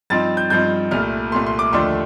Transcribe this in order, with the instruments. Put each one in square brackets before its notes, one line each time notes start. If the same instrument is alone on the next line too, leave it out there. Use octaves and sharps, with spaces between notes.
[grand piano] G2 F3 C4 D#4 A6
G6
G2 F3 C4 D#4 G6
C2 A#2 A3 F6
C2 A#2 A3 C6
C6
D6
D#2 D3 F3 A3 D4 C6